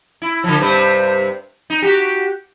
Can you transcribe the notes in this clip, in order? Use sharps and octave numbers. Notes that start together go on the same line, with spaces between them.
E4
D3 F3
G2 C3 C5
D#4
F#4 G4